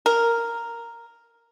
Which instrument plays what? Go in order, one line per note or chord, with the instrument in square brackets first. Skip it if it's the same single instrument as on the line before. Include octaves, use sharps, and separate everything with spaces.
[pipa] A#4